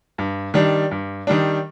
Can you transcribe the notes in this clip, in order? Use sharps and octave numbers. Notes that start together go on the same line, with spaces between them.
G2
D#3 G3 D4
G2
D#3 G3 D4